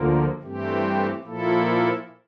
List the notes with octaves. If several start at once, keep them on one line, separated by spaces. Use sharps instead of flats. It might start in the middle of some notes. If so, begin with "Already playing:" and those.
Already playing: D2 D3 F3 A#3
G2 E3 A3 C4 G4
A#2 F3 A#3 E4 A4